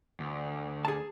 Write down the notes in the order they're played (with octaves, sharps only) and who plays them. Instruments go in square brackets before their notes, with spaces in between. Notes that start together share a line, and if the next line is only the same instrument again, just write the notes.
[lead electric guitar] D2
[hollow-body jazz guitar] G#4 A5